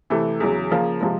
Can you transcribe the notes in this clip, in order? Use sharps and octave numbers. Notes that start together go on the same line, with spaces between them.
C3 E3 A3
E2 C#3 F#3
C#3 F3 A#3
C3 F3 G#3